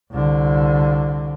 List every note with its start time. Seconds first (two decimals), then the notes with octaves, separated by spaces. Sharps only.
0.12 C2 D3